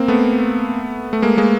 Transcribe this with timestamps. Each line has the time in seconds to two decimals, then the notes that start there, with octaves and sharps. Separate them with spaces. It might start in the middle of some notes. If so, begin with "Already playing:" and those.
Already playing: A#3 C4
0.08 A3 B3
1.13 A3
1.22 G#3 A#3
1.37 G#3 A#3